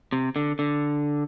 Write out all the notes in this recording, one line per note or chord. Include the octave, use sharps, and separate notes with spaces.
C3
D3
D3